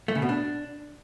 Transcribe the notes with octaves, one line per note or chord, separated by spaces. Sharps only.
A3
C#3
B2
D4